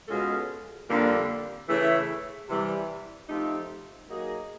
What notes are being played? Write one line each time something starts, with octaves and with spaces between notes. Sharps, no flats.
B2 G#3 C#4 F4 A4
F2 D3 G3 A#3 D4
C#3 E3 A3 C#4 E4
C3 E3 G3
F3 A3 C4 D#4 G4
F#3 A#3 D#4 G#4